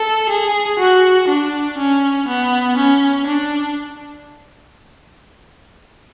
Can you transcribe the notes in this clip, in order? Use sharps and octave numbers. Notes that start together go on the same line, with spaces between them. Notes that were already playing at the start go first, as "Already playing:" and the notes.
Already playing: A4
G#4
F#4
D4
C#4
B3
C#4
D4